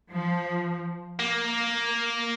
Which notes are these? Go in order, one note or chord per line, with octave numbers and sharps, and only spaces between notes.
F3
A#3